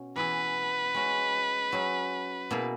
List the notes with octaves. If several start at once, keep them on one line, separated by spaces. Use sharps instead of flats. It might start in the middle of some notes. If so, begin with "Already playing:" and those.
Already playing: B2 C#4
E3 B3 E4 G#4 B4
G#3 C#4 F#4
F#3 C#4 G#4
B2 A#3 E4 G#4